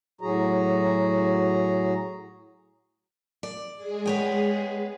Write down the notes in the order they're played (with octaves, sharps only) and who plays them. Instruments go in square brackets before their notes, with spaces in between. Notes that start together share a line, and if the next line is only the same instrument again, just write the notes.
[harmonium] A2 F#3 F#4 G#4 A#5
[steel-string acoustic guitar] D5
[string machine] G#3 G#4
[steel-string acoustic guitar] B3 C#5 G5